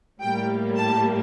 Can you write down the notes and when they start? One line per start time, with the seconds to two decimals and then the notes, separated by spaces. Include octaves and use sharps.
0.21 A2 G3 A#3 G5
0.77 A5